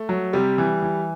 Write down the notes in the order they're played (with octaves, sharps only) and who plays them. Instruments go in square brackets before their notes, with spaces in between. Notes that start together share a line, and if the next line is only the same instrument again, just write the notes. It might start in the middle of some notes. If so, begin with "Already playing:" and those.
Already playing: [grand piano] A3
F#3
C3 G3
E3
E3